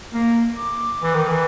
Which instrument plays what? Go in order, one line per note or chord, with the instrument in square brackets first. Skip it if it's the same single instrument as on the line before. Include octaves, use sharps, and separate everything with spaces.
[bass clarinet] A#3
[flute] D6
[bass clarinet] E3
D#3
E3